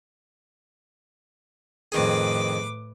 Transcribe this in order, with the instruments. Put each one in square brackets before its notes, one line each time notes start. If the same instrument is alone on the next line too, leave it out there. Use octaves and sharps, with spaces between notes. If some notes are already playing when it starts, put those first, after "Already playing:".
[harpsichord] F2 D#3 G#4 [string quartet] A2 B4 D6